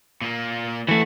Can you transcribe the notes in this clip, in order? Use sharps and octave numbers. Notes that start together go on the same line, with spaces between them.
A#2 A#3
E3 A3 F#4